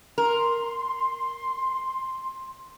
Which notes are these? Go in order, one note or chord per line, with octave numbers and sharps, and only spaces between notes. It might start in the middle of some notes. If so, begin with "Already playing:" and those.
A#4 C6